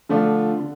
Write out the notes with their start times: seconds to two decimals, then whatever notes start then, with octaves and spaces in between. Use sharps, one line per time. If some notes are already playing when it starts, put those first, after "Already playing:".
0.09 D3 F3 A3 D4 F4
0.59 D3